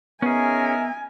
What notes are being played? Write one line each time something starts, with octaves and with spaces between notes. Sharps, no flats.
B3 C#4 D#4 G#4 A#4 E5 G#5